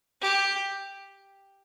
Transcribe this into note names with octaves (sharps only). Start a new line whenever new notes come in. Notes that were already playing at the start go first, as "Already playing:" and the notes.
G4